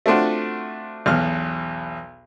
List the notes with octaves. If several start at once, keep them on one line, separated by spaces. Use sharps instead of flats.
A3 C4 D4 F4 F#4
B1 E2 B2 F6